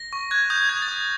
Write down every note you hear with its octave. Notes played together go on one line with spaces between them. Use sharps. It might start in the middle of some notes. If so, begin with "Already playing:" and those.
Already playing: A#6
C#6
F#6 G#6
D#6 G6
F#6 G#6
A6
D#6